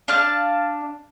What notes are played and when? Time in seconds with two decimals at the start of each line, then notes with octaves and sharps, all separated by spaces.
0.08 D4 F5 A5 F6